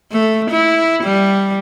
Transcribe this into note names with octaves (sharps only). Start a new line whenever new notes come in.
A3
E4
G3